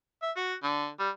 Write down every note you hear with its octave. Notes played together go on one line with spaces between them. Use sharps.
E5
F#4
D3
G3